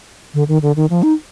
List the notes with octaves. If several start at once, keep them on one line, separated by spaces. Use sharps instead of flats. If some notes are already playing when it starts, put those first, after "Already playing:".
D3
D#3
D3
D#3
F3
D#4